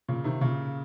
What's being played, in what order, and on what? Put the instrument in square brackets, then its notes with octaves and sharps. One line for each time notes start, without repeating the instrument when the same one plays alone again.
[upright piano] A#2 C#3
C3 D#3
A#2 C#3